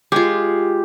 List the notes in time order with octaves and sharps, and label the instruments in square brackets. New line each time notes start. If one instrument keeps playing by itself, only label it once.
[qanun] G#3 F4 [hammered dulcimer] G4